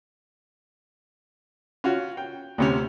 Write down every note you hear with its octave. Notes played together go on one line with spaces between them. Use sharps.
C#4 F4 F#4
G5
D2 C3 C#4